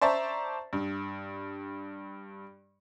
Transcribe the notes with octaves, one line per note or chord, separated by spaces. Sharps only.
C5 D5 E5 A5 A#5 C#6
G2